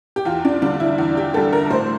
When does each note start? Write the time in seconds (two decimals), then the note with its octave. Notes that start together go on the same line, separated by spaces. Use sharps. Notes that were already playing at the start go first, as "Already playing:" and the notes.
0.16 G4
0.25 E2 F4
0.45 D4
0.62 D3 G3 D4
0.80 E4
0.98 E2
1.17 G4
1.34 D3 G3 A4
1.53 A#4
1.70 A2 C5